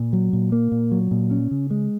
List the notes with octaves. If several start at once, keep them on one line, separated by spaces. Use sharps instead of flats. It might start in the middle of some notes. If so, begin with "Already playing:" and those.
Already playing: A#2
F#3
A#2
A#3
A#2
F#3
A#2
C#4
C#3
G#3